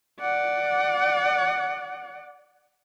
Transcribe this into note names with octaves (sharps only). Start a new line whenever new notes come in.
D5 F#5